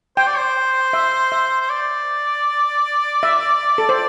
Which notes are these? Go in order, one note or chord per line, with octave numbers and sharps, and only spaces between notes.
C5 G5
D5
C5
E5
E5
C5
D5
E5
A4
C5